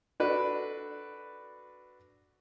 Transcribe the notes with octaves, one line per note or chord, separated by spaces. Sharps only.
D4 F#4 A4 B4 D5